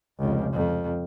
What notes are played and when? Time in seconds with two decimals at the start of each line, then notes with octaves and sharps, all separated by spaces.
0.19 F1 C#2
0.53 F2